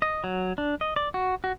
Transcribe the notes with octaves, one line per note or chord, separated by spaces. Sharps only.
D#5
F#3
D4
D#5
D5
F#4
F#4